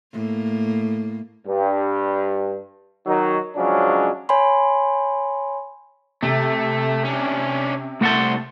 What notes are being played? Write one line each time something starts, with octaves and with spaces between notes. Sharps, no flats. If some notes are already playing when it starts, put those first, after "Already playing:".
A2 A#3
G2
D#3 F#3 D#4
C#3 F3 F#3 G#3 C#4 D4
C#5 G#5 B5 C6
C3 A3
C#4 D4
C2 A3 C5 F#5 A5